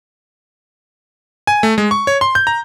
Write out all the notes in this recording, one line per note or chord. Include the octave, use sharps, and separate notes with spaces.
G#5
A3
G#3
C#6
C#5
C6
G6
A#5